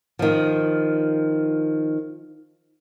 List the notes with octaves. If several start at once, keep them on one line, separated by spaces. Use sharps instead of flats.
D#3 F3